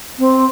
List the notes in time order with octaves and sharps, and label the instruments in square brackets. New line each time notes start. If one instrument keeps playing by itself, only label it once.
[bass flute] C4